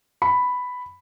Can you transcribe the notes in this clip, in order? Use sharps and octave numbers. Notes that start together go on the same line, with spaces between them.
B5